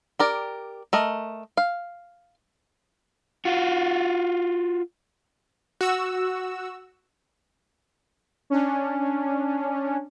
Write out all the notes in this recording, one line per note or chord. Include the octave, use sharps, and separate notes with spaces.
G4 A#4 D5
A3 A#4 D#5
F5
F4 F#4
F#4 E6
C#4 D4